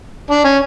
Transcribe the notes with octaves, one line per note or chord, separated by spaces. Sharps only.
D4
C#4